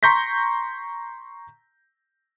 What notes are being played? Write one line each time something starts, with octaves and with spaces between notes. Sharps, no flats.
A#5 C6 C#6 G6 A#6 B6